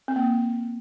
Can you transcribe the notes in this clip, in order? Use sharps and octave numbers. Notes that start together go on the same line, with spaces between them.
C4
A#3